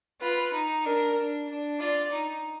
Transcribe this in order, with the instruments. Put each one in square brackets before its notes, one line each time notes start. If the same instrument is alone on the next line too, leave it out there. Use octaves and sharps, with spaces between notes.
[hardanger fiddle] F4 [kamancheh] B4
[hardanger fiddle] D#4
[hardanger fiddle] D4 [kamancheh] A#4
[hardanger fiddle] D4
D4
[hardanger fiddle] F4 [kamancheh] D5
[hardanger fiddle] D#4